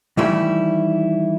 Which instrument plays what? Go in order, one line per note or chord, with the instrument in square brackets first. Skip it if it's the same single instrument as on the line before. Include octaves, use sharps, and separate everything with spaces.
[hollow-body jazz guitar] D#3 E3 G3 A3 E4